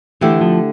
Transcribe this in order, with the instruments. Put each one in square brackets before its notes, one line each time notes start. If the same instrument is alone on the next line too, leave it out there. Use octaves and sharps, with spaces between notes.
[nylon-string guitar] D3 A3 E4 G4 [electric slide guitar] E3
[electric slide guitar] F3